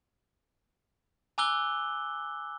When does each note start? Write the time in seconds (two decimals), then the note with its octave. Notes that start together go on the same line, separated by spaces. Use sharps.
1.38 G#5 A#5 D6 E6 F#6 G7